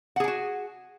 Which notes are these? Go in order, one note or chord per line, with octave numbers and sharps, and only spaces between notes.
F#4 G#4 F#5 G#5